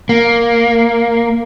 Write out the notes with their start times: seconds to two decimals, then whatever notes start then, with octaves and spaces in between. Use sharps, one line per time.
0.09 A#3